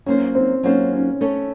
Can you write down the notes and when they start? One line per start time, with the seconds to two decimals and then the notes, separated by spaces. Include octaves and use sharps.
0.06 F#3 A#3 C#4 F4 C5
0.35 C4
0.63 F#3 A#3 C#4 F4 C5
0.93 C#4
1.21 A3 C#4 A4 C#5